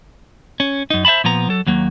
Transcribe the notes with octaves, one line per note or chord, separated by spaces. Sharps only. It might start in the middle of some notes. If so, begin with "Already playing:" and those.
C#4
F#2 D#4
C5 E5 F5 A5 B5
A#2 F3 B3 A#5
F#3 A4
D#2 F#3 A#3